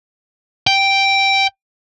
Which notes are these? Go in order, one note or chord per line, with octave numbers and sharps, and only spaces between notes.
G5